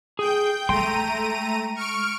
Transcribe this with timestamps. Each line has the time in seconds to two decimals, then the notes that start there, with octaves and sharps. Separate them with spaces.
0.19 G#4 G5 G6
0.69 G#3 A3 G5 A#5 C6 D#7
1.75 C#6 F6 D7